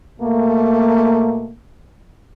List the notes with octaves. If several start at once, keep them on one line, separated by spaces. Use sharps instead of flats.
B2 A3 A#3